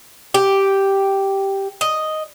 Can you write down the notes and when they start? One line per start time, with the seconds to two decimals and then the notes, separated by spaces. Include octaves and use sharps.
0.34 G4
1.81 D#5